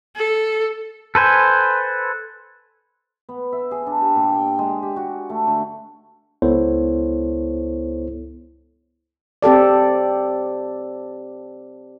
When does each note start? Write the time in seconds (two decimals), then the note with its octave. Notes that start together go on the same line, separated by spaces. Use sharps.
0.16 A4
1.15 A4 B4 C5 G#5
3.29 B3
3.52 E5
3.71 G#4
3.87 D4
4.01 G4
4.15 A#2
4.32 G5
4.59 G#3
4.83 G4
4.96 F#4
5.30 A3
5.47 D3
6.42 C#2 B3 E4 A4 C5 C#5
9.42 C4 G4 A4 D5